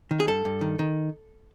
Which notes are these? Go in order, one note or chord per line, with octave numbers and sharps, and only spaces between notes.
D#3
G#4
G2 A4
G2
D#3
D#3